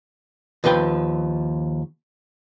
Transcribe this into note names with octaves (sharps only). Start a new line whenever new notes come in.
D#2 F3 B4 G5